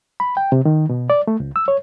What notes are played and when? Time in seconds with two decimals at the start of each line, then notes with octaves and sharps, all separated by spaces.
0.20 B5
0.37 G5
0.52 C3
0.65 D#3
0.89 B2
1.10 D5
1.27 A3
1.40 C#2
1.56 E6
1.68 C#5